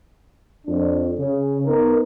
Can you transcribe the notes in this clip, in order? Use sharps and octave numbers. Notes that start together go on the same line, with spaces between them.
F2 D4
C#3
B3 D#4 A#4